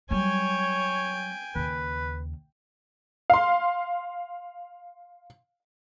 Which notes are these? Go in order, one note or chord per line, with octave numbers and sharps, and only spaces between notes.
F#3 G3 C#5 G5 G#5
D#2 C#3 B4
F5 C6